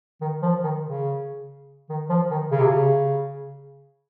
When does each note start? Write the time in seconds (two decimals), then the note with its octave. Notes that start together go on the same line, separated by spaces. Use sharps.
0.21 D#3
0.42 F3
0.63 D#3
0.84 C#3
1.89 D#3
2.10 F3
2.31 D#3
2.52 C#3
2.60 C3
2.67 C#3